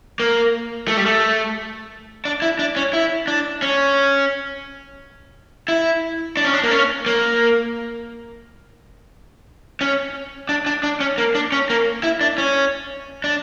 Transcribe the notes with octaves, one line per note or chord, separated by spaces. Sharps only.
A#3
A3
G3
A3
D4
E4
D4
C#4
E4
D4
C#4
E4
D4
C#4
D4
A#3
C#4
A#3
C#4
D4
D4
D4
C#4
A#3
D4
C#4
A#3
E4
D4
C#4
D4